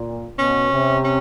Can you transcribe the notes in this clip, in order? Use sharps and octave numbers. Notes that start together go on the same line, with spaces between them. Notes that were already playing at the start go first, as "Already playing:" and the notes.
Already playing: A#2
B2 C#4
C3
C#4